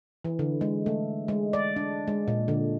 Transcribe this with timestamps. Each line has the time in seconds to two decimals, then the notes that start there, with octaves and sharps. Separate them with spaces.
0.24 E3
0.39 D3
0.61 G#3
0.86 A3
1.28 G#3
1.53 D5
1.76 D4
2.07 G#3
2.28 A#2
2.48 D3